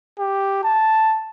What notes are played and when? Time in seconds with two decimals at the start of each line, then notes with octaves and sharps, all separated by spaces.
0.19 G4
0.64 A5